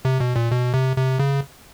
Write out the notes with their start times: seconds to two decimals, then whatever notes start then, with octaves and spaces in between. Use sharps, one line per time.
0.05 C3
0.20 B2
0.36 A#2
0.51 B2
0.74 C3
0.97 C3
1.19 C#3